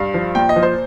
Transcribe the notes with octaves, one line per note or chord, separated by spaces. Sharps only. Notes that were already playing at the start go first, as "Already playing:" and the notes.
Already playing: G2 F5
F3
A#2 G5
D#5
F3
C5